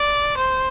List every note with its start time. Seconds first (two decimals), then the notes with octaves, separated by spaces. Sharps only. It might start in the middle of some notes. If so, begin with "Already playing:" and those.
Already playing: D5
0.37 C5